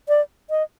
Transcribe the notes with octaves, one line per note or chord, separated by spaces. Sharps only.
D5
D#5